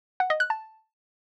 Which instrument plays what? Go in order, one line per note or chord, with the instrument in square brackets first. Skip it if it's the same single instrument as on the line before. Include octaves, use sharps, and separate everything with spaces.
[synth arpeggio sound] F#5
D#5
F#6
A5